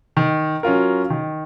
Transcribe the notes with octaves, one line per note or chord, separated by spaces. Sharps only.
D#3
F#3 C#4 F4 A#4
D#3